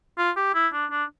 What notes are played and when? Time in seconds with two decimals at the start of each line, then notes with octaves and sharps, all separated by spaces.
0.18 F4
0.37 G4
0.55 E4
0.73 D4
0.91 D4